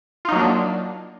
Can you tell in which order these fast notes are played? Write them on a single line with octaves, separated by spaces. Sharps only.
F4 D#4 F#3 A#3 D4